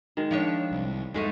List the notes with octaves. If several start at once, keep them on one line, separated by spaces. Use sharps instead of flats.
D#3 G#3
F3 D4 C#5
C2
F2 G#2 G#3 A3 D#4